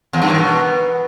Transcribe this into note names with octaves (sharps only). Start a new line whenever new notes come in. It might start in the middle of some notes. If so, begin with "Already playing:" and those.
E2
G2
D#3
B2